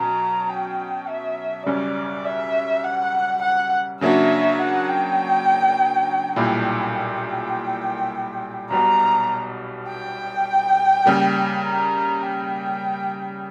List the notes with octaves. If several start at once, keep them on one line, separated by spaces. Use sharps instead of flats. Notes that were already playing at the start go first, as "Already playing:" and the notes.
Already playing: B2 F#3 C#4 A#5
G5
E5
F#2 C#3 G3 C#4 D5
E5
F#5
F#5
C#3 F#3 A#3 D4 F#4 E5
F#5
G5
B1 A#2 G3 A#3 E4 G5
G5
B1 B2 G3 B3 A#5
G5
C#3 G3 A#3
A#5
G5